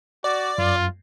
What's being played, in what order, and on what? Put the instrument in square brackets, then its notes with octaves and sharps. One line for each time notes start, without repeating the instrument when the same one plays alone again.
[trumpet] F#4 [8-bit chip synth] D5
[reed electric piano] F#2 [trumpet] F4